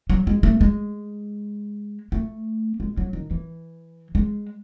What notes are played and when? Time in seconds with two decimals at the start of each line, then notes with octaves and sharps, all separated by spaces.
0.10 F#3
0.27 G#3
0.43 A3
0.61 G#3
2.12 A3
2.80 G#3
2.97 F#3
3.13 D#3
3.31 E3
4.15 G#3